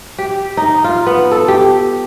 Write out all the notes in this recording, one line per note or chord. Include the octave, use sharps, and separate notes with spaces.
G4
D#4
F4
B3
A4
G4